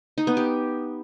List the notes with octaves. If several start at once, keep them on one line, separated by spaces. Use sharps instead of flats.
D#4
B3
G4